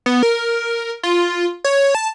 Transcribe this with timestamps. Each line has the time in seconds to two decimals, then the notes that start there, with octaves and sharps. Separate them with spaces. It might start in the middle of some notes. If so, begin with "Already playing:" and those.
0.06 B3
0.23 A#4
1.03 F4
1.64 C#5
1.95 A5